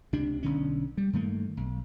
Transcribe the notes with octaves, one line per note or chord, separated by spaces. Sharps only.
C#2 C3 D4
B1 D3 C#4
G3
G2 D#3 A3 A#3
B1